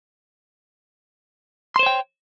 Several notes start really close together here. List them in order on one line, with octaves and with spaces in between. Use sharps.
C6 C5 C#5 G5